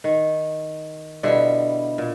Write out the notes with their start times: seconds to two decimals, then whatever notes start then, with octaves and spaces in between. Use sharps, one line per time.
0.04 D#3
1.23 B2 D3 G3 E4
1.98 A#2